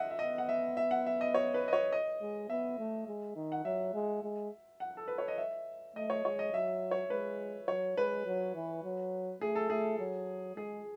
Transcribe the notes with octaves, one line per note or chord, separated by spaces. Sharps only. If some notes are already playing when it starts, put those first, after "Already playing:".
Already playing: D#5 E5 F#5
E5
B3 D#5
F#5
E5
E5
F#5
E5
D#5
C#5
B4
D#5
C#5
D#5
G#3
B3 E5
A3
G#3
D#3
F#5
F#3 E5
G#3
G#3
F#5
A4
B4
C#5
D#5
E5
A3 D#5
C#5
G#3 C#5
D#5
F#3 E5
C#5
G#3 B4
F#3 C#5
G#3 B4
F#3
E3
F#3
A3 G#4
A4
A3 G#4
F#3
G#3 G#4